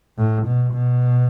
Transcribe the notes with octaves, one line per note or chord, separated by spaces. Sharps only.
A2
B2
B2